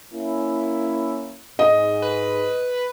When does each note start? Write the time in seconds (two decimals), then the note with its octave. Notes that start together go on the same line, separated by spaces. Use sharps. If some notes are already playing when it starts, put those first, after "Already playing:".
0.13 A#3 C#4 E4
1.59 G#2 D#5
2.02 B4